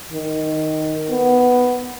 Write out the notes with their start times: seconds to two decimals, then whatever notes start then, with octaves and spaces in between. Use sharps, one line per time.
0.13 D#3
1.10 B3